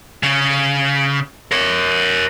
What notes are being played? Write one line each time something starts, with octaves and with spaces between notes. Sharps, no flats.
C#3
A#4 C#5